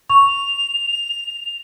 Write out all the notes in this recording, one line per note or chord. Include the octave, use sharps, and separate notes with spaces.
C#6 F7